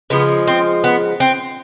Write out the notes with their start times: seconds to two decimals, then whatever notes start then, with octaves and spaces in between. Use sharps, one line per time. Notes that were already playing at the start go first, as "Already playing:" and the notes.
0.10 C#3 F3 G#3 B3
0.47 C4
0.84 B3
1.20 C4